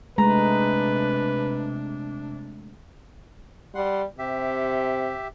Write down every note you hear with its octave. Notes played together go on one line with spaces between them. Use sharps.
C3 G#3 A3 D4 B4 A#5
G3 F#5 C6
C3 G4 E5